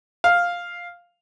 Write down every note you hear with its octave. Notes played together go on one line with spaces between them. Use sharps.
F5